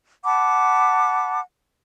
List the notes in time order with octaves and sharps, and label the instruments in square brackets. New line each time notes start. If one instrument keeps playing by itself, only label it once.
[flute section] F#5 A5 B5 D6